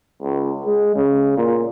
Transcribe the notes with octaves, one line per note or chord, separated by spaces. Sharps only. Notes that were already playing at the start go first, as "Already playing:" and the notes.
C#2
G#3
C#3
A#2